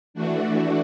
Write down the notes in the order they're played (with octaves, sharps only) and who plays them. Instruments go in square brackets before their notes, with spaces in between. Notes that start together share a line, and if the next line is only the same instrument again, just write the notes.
[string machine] E3 A3 D4 F#4